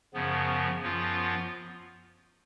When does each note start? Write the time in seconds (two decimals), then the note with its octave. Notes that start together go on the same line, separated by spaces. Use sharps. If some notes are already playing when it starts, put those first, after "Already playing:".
0.14 F#2 C#3 F3 B3
0.80 F#2 F3 B3 F4